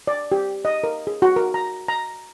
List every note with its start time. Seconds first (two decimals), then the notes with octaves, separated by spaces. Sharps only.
0.07 D5
0.32 G4
0.65 D#5
0.84 A#4
1.07 G#4
1.22 F#4
1.36 A#4
1.54 A#5
1.88 A#5